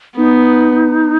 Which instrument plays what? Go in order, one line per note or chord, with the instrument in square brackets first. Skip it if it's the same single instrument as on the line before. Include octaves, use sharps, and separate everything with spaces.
[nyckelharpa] B3 [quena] D#4